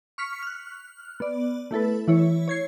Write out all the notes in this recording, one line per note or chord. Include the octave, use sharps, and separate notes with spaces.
C#6 F6 B6 C#7
F6 F#6
B3 D5
A3 E4 A4 B4
E3 E4 C#5
C#5 G#6 C7